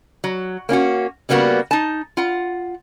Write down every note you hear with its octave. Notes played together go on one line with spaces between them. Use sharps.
F#3
A#3 C#4 F4 F#4
C#3 G3 A#3 B3 F#4
D#4 A5
F4 F#5